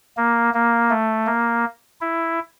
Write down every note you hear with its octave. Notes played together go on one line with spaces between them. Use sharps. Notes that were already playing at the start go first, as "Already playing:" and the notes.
A#3
A#3
A3
A#3
E4